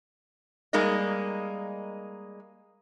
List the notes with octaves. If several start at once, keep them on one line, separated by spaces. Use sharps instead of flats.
G3 G#3 A#3 D#4 D#5